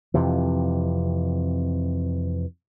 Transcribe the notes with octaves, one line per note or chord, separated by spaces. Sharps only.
F2 C3 E3